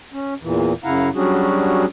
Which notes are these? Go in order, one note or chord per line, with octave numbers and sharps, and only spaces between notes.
C#4
E2 A#2 E3
F#2 C#3 E4 F5 F#5 A#5
F#3 G3 C#4 D4 F#4 G#4